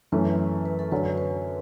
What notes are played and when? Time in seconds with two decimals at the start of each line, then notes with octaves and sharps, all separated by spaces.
0.12 F#2 E3 A3 C#4 B4
0.26 B4
0.39 B4
0.65 B4
0.79 A4
0.92 F#2 D3 F#3 C#4 B4
1.18 B4